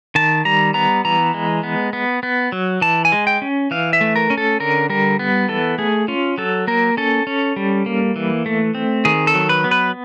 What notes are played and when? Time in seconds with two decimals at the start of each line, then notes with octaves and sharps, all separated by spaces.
0.15 D#3 A5
0.45 G3 A#5
0.74 B3 A#5
1.05 E3 A#5
1.34 G#3
1.63 B3
1.93 B3
2.23 B3
2.52 F#3
2.81 E3 A5
3.05 G#5
3.12 G#3
3.27 G5
3.42 C#4
3.71 E3 F5
3.93 E5
4.01 A3
4.16 A#4
4.30 C#4
4.38 A4
4.60 D3 A#4
4.90 G3 A#4
5.19 B3
5.49 E3 A4
5.78 A3 G#4
6.08 C#4 F4
6.38 F#3 A4
6.67 A#3 A#4
6.97 C#4 A4
7.27 C#4
7.56 G3
7.86 A#3
8.16 E3
8.46 A3
8.75 C4
9.05 D#3 G#4
9.27 A4
9.34 F#3
9.49 B4
9.64 B3
9.71 B4